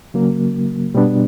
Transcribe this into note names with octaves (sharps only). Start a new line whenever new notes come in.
C#3 F#3 A#3
B2 G3 B3 D4